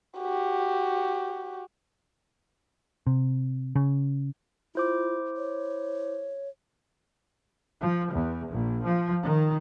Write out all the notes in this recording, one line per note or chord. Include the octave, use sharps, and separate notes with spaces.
F#4 G4
C3
C#3
E4 F4 C5 D6
C#5
F3
E2
A#1
F3
D#3